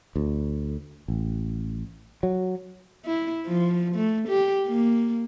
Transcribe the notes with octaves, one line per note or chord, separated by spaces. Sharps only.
D2
A1
F#3
E4
F3
A3
G4
A#3